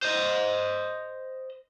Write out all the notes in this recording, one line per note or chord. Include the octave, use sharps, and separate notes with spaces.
C5 D#5